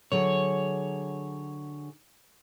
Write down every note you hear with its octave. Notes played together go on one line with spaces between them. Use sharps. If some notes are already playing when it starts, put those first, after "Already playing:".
D3 F#3 G#4 C#5